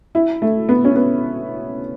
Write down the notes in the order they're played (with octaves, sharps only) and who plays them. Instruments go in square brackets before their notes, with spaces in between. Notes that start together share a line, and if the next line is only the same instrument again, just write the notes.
[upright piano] E4
A3
B3
C#4
B3